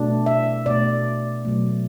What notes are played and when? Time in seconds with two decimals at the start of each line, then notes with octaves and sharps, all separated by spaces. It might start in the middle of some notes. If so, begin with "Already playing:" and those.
Already playing: B2 A3 D4
0.26 E5
0.66 B2 A3 D5
1.45 B2 F#3 A3